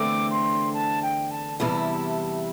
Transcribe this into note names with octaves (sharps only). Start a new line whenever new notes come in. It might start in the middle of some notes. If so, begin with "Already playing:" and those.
Already playing: E2 D3 A3 C4 D6
C6
A5
G5
A5
E2 C3 G3 E4 A5